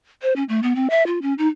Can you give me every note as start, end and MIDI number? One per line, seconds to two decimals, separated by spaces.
0.22 0.35 72
0.36 0.44 61
0.49 0.61 57
0.63 0.74 59
0.76 0.88 60
0.90 1.05 76
1.07 1.19 65
1.22 1.34 61
1.38 1.47 63